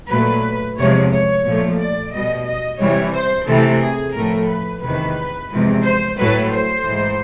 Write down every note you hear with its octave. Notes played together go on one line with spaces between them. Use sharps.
A#2 F#3 A3 B4
E2 C3 F3 G#3 C#5
C#5
A#2 F3 A3
D5
B2 G3 D#5
D#5
C3 E3 G3 C#5
C5
C3 E3 A3 A4
G#4
A2 F3 A3 A#4
B4
E2 C3 D#3 B4
E2 C3 F3 G#3
C5
A2 F#3 A3 B4
C5
G#2 E3 G#3